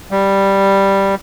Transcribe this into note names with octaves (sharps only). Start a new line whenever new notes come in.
G3